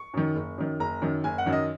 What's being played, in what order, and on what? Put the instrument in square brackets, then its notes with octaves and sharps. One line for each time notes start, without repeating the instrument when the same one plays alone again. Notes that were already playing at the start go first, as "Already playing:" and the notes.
Already playing: [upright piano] C#6
F#2 D#3
F#1
F#2 D#3
F#1 A#5
F#2 D#3
F#1 G#5
F#5
F#2 D#3
D#5